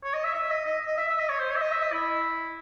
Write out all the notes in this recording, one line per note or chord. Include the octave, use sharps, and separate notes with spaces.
C#5
D#5
E5
E5
D#5
D#5
D#5
E5
E5
D#5
C#5
C5
C#5
E5
D#5
E5
D#5
E4